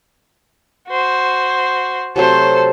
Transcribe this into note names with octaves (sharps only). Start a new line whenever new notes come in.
F#4 C5
C3 F#3 A3 A4 C5